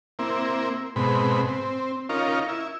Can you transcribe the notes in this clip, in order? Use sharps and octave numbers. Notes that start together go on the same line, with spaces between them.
A#3 C4 E4
G#2 B2 C4 B5
C4
C#4 D#4 F4 A#4
E4